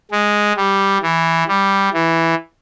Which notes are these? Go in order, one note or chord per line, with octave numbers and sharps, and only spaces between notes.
G#3
G3
E3
G3
E3